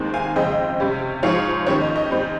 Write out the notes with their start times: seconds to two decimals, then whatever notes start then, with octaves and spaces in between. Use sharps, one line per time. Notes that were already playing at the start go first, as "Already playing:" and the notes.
Already playing: D#2 D#3 G#3 C4
0.14 F5 G#5
0.36 F2 C#3 G#3 C4 D#5 G5
0.80 C3 G3 C#4
1.23 G#2 F3 G#3 C#5 F5
1.66 D#2 D#3 G3 C#4 C#5
1.81 D#5
1.96 D#5
2.10 G#2 G3 C4